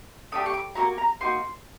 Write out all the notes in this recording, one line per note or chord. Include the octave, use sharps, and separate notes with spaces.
A3 D4 G4 D#6
C#6
D6
A#3 D#4 F#4 A#5
A#5
A#3 D#4 F#4 C6